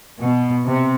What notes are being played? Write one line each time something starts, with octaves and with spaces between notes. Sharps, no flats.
B2
C3